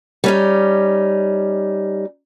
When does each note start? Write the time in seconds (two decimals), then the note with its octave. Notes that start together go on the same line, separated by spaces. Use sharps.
0.24 G3 C#4 D#4